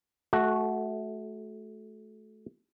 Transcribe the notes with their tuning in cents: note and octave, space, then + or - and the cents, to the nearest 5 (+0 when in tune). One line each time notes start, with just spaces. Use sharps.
A3 -25 F#4 +0 A4 +0